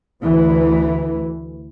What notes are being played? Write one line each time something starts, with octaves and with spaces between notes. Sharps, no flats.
D2 E3